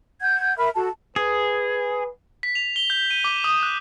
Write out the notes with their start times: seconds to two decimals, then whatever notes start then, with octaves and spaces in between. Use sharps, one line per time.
0.21 F#5 G6 G#6
0.57 A#4 E5 B5 F6
0.75 F#4 A4 A5
1.16 G#4 B4
2.43 B6
2.55 F7
2.76 G7
2.90 G6
3.10 D#7
3.24 D6
3.44 D#6
3.63 F#6